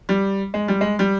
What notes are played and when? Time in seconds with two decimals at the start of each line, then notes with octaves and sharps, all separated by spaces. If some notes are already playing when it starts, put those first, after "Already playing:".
0.09 G3
0.54 G#3
0.68 G3
0.81 G#3
0.99 G3